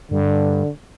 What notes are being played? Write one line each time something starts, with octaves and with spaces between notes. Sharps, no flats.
G2 D3